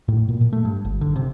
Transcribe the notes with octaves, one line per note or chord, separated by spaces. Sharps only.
A2
A#2
A#2
A3
G2
G1
D3
C3